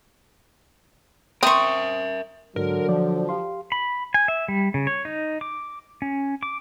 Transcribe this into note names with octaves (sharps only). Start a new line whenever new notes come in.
C4 A#4 E5 C#6 D#6
G#2 D3 F#3 A#4
F3 D5
G4 F5 C6
B5
G#5
E5
G3
C#3
C#5
D#4
D6
C#4
D6